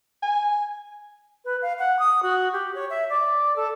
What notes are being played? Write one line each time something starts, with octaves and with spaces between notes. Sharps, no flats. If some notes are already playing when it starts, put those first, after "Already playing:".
G#5
B4
F5
F#5
D#6
F#4
G4
C#5
E5
D5
A4